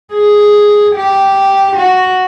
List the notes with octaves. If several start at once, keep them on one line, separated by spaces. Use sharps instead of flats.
G#4
G4
F#4